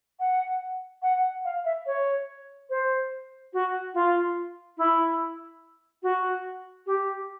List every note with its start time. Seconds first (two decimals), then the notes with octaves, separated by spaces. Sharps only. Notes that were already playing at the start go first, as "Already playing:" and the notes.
0.20 F#5
1.02 F#5
1.45 F5
1.65 E5
1.86 C#5
2.70 C5
3.53 F#4
3.94 F4
4.78 E4
6.03 F#4
6.86 G4